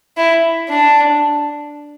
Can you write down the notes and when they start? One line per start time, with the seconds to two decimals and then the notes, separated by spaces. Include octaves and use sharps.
0.17 E4
0.69 D4